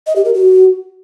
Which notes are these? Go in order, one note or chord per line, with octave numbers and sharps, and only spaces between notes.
D#5
G4
A#4
F#4